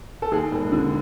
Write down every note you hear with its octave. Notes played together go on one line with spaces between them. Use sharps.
A4
D#2 G#4
E1
D3